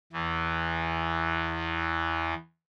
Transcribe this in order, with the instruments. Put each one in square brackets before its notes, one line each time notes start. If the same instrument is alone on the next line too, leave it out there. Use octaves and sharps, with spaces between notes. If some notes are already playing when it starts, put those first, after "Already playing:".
[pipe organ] E2 E3